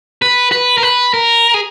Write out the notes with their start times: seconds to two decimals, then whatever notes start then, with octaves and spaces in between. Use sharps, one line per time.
0.22 B4
0.52 B4
0.78 A#4
0.83 B4
1.14 A#4
1.54 G#4